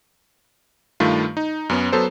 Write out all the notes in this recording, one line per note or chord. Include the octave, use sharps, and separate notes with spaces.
G2 D#3 A3 F4
D#4
F#2 B3 C#4
F#3 B3 A4 C5